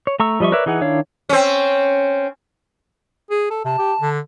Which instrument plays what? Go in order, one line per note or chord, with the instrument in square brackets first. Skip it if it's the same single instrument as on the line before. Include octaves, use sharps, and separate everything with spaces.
[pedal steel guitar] C#5
A3 A#5 C#6 E6
F3 G3 D#5 E5 C#6
A#4 B4 C#5 D5 E5
E3 D#4 G#4 F#5
D#3 D4 E4 C#5 F5
[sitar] C4 C#4
[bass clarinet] G#4
A4
[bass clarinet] C3 [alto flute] A5
[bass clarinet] G4
D3